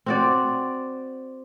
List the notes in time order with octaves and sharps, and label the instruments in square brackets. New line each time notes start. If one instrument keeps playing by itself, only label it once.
[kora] C4 F#4 D5